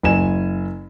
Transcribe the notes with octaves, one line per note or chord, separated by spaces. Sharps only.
F#1 G#5 E7